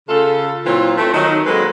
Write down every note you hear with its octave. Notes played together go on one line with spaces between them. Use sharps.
C#3 F4 A4
A#2 E3 F#3 C4 F4
A3 C4
D#3 F#3 D#4
F#3 G#3 A#3 C4 A4 B4